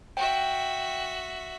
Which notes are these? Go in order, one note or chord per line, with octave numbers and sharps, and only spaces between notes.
F#4 E5 G5